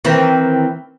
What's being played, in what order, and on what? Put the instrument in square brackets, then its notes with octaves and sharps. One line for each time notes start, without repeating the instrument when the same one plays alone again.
[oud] D#3 E3 C4